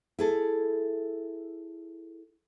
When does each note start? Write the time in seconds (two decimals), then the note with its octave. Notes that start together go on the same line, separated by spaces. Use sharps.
0.19 E4 G#4 A4